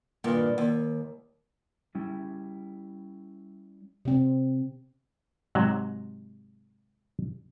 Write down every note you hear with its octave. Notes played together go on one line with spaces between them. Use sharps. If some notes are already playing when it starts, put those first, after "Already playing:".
G2 A#2 D#3
D#2
G3 C#4 E4
C3 C4
G#2 C3 F#3